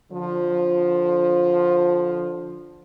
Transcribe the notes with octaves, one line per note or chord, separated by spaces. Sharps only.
D3 F3